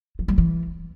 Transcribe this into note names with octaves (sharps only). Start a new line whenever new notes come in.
F3
G3
E3